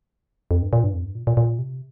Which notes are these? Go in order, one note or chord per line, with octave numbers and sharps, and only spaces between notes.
F2
G2
A#2
G2
F2
G2
A#2
A#2
A#2
C3